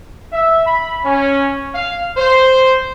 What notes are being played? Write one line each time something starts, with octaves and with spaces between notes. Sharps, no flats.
E5
B5
C#4
F5
C5